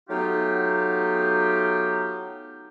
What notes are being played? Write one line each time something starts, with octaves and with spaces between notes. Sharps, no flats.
F#3 A3 B3 D#4 F4 G4